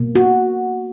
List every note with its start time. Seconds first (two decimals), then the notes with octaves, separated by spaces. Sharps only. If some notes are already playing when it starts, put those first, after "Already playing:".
Already playing: B2 A#3
0.15 F#4